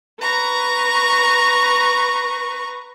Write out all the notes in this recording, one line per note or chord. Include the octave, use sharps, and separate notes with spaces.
B4 A#5 C#6